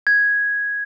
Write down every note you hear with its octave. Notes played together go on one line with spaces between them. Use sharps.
G#6